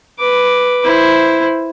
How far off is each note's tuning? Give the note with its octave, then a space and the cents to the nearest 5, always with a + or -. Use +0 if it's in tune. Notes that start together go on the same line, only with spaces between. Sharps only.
B4 +0 D6 +0
E4 +0 C5 +0